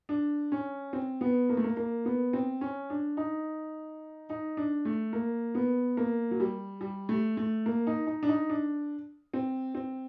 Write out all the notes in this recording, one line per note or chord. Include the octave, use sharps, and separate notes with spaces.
D4
C#4
C4
B3
A#3
A3
A#3
A#3
B3
C4
C#4
D4
D#4
D#4
D4
A3
A#3
B3
A#3
F#3
G3
G3
A3
A3
A#3
D#4
D#4
D4
D#4
D4
C4
C4